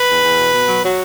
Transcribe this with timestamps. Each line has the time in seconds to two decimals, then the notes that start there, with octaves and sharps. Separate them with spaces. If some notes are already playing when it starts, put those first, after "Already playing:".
Already playing: B4
0.08 E2
0.23 E2
0.38 B2
0.52 B2
0.67 F#3
0.83 F#3